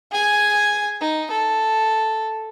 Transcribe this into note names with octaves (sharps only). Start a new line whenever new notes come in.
G#4 G#5
D#4
A4